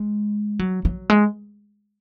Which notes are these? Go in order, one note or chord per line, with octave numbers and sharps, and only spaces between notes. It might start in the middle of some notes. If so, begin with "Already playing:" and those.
Already playing: G#3
F#3
F#3
G#3